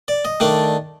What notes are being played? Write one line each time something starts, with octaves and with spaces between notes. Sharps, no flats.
D5
D#5
D#3 A3 D4 D5